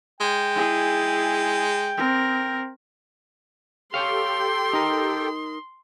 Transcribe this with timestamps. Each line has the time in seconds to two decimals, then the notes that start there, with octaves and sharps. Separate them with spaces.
0.21 G#3 G5
0.55 E4 G#4
1.97 C4 A#4
3.94 G4 A4 C#5 F5 G5 C6
4.73 D#4 A#4